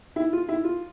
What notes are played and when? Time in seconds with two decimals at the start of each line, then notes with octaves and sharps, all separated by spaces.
0.16 E4
0.33 F4
0.49 E4
0.64 F4